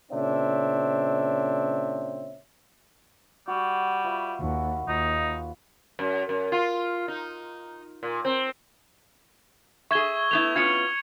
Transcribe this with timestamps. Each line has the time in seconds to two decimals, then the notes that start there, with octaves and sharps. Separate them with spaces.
0.11 A#2 C#3 C4 D4 C#5 E5
3.48 G3 F#4
4.04 F4 B4 E5
4.40 D#2 F#4
4.88 D#2 D#4 F4
5.99 F#2
6.29 F#2
6.52 F4
7.08 D#4
8.03 A#2
8.25 C4
9.91 G#4 E5 C#6 G#6 G7
10.31 A3 B3 E4 F7
10.56 B3 C#4 F4 G#6 C#7